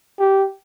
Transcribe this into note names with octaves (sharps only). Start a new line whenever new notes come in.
G4